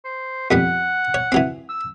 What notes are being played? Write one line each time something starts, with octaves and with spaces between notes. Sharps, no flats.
C5
F2 G3 B3 F#5
C#5
E3 F#3 C4
E6